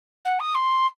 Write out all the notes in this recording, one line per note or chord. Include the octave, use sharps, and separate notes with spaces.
F#5
D#6
C6